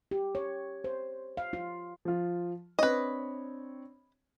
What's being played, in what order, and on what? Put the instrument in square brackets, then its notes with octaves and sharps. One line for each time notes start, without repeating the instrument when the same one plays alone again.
[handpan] G4
C#5
C5
F5
F4
[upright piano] F3 F4
[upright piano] C4 D4 C#5 [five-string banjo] B4 D#5